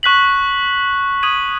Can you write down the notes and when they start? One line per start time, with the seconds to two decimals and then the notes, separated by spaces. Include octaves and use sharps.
0.03 C#6 F#6 B6 F#7
1.23 D#6 G#6 D#7 F#7